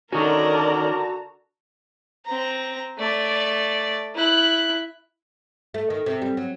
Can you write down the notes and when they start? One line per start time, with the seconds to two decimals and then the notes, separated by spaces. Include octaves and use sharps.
0.12 D3 D#3 C#4 F#4 A#4 D5 A5 A#5
2.25 C4 A#5
2.98 A3 D5
4.15 E4 F#6
5.74 A3
5.90 D#3
6.06 C3
6.22 G3
6.37 F#3